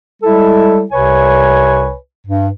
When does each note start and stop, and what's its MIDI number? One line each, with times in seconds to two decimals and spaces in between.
0.23 0.83 55
0.23 0.83 56
0.23 0.83 64
0.23 0.83 69
0.92 1.93 36
0.92 1.93 48
0.92 1.93 71
0.92 1.93 73
0.92 1.93 80
2.27 2.48 43